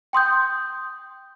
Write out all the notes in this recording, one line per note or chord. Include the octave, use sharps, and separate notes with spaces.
G5 C6 D#6 G6